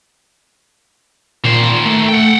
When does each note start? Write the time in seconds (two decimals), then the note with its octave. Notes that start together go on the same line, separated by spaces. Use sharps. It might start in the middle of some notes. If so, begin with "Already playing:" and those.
1.45 A#2 D#3 C5
1.86 A3
2.08 F#5 G5